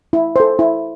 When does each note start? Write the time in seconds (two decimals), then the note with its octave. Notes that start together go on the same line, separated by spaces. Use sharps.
0.13 E4
0.36 A4 C5
0.59 E4